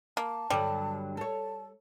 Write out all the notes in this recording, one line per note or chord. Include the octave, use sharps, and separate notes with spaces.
A#3 A5
G2 D3 F#3 G3
A4 C#5 A5